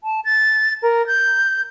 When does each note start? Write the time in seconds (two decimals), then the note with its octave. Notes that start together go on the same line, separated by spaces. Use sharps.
0.04 A5
0.25 A6
0.83 A#4
1.07 G6